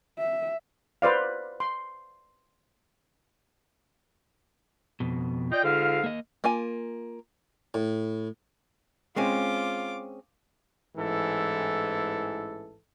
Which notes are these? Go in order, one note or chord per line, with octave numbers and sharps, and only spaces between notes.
E5
B4 C5 D5 F5
C6
F2 B2
F4 D5 D#5 G5
G#2 D3 F5
A#3 D#5
A#3 F4 G#5
A2
G#3 C4 C#4 F4 D6
A1 G#2 E3 A4